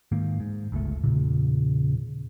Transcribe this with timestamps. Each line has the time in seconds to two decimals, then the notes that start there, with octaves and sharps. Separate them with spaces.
0.12 G#2 D#3 A#3
0.40 G#2
0.72 G1 C#2 A3
1.04 E2 A#2 C#3